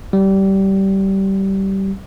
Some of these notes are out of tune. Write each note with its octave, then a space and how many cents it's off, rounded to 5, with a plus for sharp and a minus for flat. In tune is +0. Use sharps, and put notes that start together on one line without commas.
G3 -20